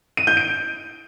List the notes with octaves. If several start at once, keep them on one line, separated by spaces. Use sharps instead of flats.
D#7
G6
D7